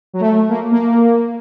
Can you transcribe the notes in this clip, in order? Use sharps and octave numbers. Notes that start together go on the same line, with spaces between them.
F#3
A3
A#3
A#3